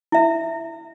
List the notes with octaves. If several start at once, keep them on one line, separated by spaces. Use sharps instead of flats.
E4 E5